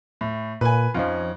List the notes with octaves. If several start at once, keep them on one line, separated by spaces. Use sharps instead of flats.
A2
A#2 B4 G#5
F2 F3 C#4 D#4 F4